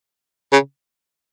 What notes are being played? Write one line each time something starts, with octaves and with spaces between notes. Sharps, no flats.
C#3